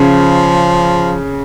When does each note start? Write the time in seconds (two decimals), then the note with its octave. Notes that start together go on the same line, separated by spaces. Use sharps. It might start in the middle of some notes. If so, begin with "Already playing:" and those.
Already playing: C#3 F3